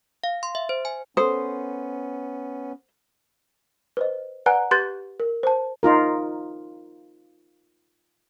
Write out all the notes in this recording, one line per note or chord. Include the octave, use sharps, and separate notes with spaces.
F5
C6
E5
C5
G#5
B3 C#4 A4 C5 D#6
B4 C5 D#5
B4 D5 F#5 G#5 A#5 F#6
G4 B4 C6 F#6 G6 A6
A#4
C5 A5
D#4 F4 A#4